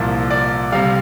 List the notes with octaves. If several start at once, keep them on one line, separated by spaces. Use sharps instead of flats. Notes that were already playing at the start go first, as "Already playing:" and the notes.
Already playing: C2 A#2 F3
D5
C3 G3 F5